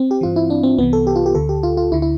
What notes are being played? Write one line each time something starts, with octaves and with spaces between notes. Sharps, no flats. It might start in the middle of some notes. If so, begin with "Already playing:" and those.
Already playing: C4
G4
G2 E3 F4
E4
D4
C4
C2 C3 E3 B3
A4
G4
F4
G4
D2 D3 A4
G4
F4
F4
D2 D3 E4
E4